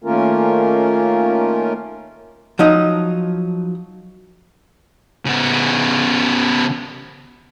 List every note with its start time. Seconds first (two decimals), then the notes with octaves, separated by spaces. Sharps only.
0.04 D#3 A3 A#3 C#4 F4 A#4
2.59 F3 F#3 D#4
5.26 C#3 B3